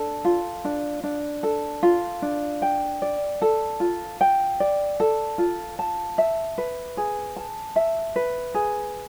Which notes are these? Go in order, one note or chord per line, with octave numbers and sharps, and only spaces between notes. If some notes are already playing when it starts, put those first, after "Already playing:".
Already playing: D4 A4
F4
D4
D4
A4
F4
D4
G5
D5
A4
F4
G5
D5
A4
F4
A5
E5
B4
G#4
A5
E5
B4
G#4